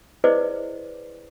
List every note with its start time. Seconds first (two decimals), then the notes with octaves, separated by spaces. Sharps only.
0.24 E4 G#4 B4 C5 D5 D#5